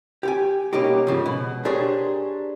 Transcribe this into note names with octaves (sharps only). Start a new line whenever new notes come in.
G4 G5 G#5
B2 A#3 C#4 D#4 G4
G#2 C#3 F3
B2
D4 G4 G#4 A#4 C5 C#5